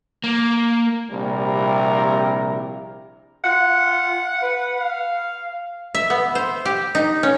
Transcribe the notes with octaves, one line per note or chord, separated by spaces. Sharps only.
A#3
A#1 C3 G3 C4 E4 A#4
F4 F#5
B4
F5
E5
B3
C5
G4
D#4
C#4